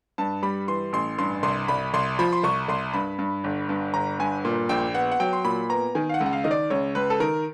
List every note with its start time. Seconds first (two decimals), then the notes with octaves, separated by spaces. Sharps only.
0.18 G2 A5
0.42 G3 B5
0.68 E3 C6
0.93 A1 C6
1.18 G2 C6
1.43 C2 C6
1.68 C2 B5
1.94 C2 C6
2.19 F3 B5
2.33 C6
2.43 C2 C#6
2.68 C2 C6
2.93 G2 B5
3.19 G2
3.44 G1
3.69 G2
3.94 G1 A#5
4.19 G2 G#5
4.45 A#2
4.69 A#1 G5
4.95 B3 F#5
5.12 F#5
5.20 F#3 G5
5.33 C6
5.45 A#2 B5
5.69 B3 A#5
5.95 D#3 G#5
6.09 F5
6.14 F#5
6.20 C#2
6.26 F#5
6.33 F5
6.44 D#3 D#5
6.51 D5
6.70 C#2 C#5
6.95 C#2 B4
7.10 A4
7.20 D#3 A#4